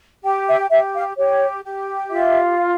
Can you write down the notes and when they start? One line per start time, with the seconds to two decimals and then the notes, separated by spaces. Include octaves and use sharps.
0.24 G4 G5
0.48 E5
0.70 G4 E5
0.94 F5
1.17 G4 C#5
1.64 G4
2.10 F4 E5